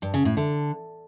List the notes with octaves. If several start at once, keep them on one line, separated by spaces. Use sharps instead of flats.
G2
C#3
A2
D3